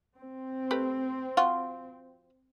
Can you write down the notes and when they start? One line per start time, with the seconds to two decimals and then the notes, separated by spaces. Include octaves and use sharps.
0.17 C4
0.71 A3 G4 B4
1.37 F3 F4 F#4